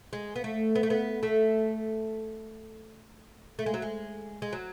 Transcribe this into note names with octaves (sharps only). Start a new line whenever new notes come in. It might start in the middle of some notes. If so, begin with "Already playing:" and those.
G#3
B3
A3
B3
A3
B3
A3
A3
G#3
F#3
G#3
G#3
F#3